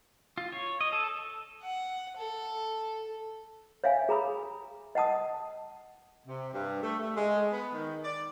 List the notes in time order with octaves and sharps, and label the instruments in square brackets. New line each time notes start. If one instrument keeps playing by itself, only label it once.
[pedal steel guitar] F4
C#5
D#5
A4
[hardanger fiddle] F#5
A4
[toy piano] C#5 E5 F5 G#5
G#4 A#5 B5 D#6
D#5 F#5 A5 D#6
[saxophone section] C3
G2
A3
A3
G#3
B3
D#3
D5